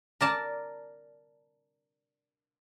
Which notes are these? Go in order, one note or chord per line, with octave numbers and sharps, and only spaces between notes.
A#4 D5 A5